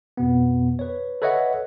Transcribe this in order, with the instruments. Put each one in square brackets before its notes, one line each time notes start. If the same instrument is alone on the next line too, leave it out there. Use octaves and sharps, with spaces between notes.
[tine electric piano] F2 B2 B3
B4 C#5
A4 B4 C#5 D#5 E5 F#5